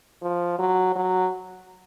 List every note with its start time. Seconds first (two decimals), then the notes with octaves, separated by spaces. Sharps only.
0.22 F3
0.59 F#3
0.95 F#3